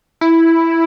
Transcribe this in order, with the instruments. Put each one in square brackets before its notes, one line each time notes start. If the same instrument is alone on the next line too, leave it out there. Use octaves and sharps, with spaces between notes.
[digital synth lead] E4